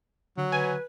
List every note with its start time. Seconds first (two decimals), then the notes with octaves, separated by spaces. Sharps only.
0.38 D3 F#3
0.52 B4 G#5